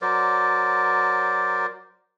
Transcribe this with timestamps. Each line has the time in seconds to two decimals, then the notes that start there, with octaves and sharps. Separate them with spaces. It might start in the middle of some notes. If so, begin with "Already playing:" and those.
0.02 F#3 A#4 C5 D5